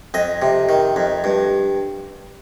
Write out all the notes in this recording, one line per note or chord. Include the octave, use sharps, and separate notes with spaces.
F2 D#5
C3
D#3
F2
G2